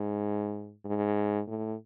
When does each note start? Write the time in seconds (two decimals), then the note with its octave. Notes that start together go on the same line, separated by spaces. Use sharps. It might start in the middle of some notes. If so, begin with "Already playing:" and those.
Already playing: G#2
0.85 G#2
1.47 A2